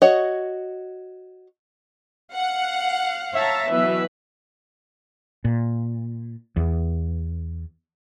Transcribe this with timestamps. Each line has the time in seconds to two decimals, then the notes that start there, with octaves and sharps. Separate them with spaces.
0.02 F#4 C#5 D#5
2.35 F5 F#5
3.35 C#5 E5 A5 A#5
3.70 B2 E3 F#3 B4
5.45 A#2
6.56 E2